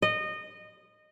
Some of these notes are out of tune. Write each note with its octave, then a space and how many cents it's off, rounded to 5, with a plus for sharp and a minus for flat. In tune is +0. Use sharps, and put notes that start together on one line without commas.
D#5 -20